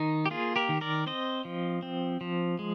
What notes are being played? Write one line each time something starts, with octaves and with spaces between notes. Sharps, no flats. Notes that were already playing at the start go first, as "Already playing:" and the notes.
Already playing: D#3 D#4
G4
A#3 F4 G#4
G4 A#4
D#3
A#4 D5
C4 C5 D#5
F3
C4
F3
G#3